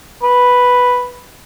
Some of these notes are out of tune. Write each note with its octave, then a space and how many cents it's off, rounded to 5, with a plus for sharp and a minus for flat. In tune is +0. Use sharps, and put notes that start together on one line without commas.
B4 +0